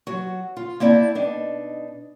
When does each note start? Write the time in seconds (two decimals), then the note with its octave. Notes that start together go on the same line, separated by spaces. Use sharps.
0.07 F#3 F#4
0.57 F4
0.80 A#3 C4 E4 D5 E5 A5
1.15 B2 D4 D#4